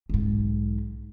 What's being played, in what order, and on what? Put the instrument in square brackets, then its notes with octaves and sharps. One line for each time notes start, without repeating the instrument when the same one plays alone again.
[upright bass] B1 G#2